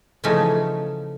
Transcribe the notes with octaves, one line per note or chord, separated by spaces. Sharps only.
C#3 E3 F3 A3 C#4 D#4